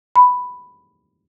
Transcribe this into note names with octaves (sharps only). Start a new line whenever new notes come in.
B5